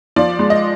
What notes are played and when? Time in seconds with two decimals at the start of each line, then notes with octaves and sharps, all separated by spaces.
0.16 F3 D5
0.39 G#3
0.50 D#5